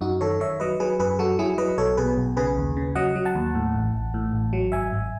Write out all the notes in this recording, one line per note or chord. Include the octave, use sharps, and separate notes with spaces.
F#2 D#4 F#4
D#3 A4 C#5
D#3 C#5 E5
F#3 B4 D#5
F#3 G#4 B4
F#2 G#4 B4
F#3 F#4 A4
F#3 E4 G#4
F#3 B4 D#5
B1 A4 C#5
B2 G#4 B4
B1
C#3 G#4 B4
D#2
C#3
F#3 D#5 F#5
F#3
F#5 A5
D#2
A2
A1
A1
A2
A1
F#3
G#1 E5 G#5
G#1